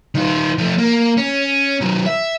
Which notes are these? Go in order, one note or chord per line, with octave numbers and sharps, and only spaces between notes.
D#3 F4
F3 A3
A#3
C#4
D#3 F#3
E5